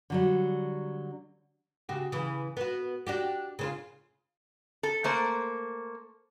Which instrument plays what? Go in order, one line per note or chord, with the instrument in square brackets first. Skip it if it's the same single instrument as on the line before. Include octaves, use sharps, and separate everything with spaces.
[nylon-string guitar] D3 F#3 G3
[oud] C#3 F#4 G4
C#3 E3
B3 F#4
D4 F#4 G4
C#3 C4 F4
[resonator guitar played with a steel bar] A4
A3 A#3 C5